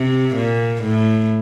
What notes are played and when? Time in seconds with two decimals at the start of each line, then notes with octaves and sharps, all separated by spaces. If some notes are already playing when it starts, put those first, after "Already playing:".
Already playing: C3
0.35 A#2
0.83 A2